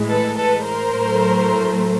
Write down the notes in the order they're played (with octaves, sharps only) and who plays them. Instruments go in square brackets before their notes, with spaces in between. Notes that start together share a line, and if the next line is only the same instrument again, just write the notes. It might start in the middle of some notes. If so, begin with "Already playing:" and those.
Already playing: [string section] A2 E3 G#3
A4 B4
A4 B4
A#4 C5
A2 F#3 A3